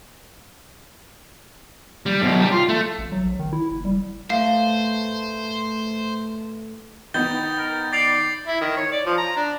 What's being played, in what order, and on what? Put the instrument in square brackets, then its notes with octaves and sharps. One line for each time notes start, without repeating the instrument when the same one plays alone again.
[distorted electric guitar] G3
F#2 B2
G3 G4
F4
A3
[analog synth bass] A1
F#3
A#1
D#3
E4
F#1
G3
[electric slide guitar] A2 [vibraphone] A3 B4 E5 [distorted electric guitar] C5 [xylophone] F5
[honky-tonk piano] D#3 B3 D#4 [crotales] G6 A6 G7
[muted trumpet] A#4
[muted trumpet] D5 [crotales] A6 C7 F7
[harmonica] E4
D#3
C#5
D5
F3
A#5
D4